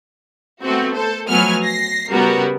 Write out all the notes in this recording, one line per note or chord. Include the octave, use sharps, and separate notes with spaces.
A3 B3 C4 F#4
A4 C5
F3 F#3 A3 B3 G#5 F6
A#6 C7
C#3 G3 B3 F#4 A#4